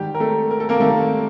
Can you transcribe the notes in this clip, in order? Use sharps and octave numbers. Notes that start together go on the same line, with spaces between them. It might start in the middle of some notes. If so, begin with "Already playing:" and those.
Already playing: G#2 D#3 G3 G4
A#4
A3 A4
A#4
A4
A#3 A#4
G#2 D#3 G3 A3 A4